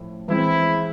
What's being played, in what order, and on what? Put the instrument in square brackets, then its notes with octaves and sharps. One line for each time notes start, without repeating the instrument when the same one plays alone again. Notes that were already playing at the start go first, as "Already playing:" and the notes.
Already playing: [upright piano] A2 F3
[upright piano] E3 G#3 C4 [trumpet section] E4